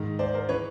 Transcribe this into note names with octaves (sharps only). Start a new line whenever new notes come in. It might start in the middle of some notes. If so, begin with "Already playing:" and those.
Already playing: G#2 D#3
C5 D5
A#4 C5
E3 B4 C#5